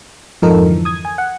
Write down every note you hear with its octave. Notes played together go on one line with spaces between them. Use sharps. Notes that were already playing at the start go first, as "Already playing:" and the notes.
F2 G#2 F3 D#4 A4 A#4
D3 E3
D#6 G#6
G#5
F#5